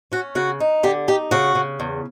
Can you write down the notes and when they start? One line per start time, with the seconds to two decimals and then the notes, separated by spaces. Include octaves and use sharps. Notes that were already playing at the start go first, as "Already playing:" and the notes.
0.12 C#4 F#4
0.35 C#3 F#4
0.60 D#4
0.83 D3 G4
1.08 D#4 G4
1.31 C#3 F#4
1.55 C#3
1.80 E2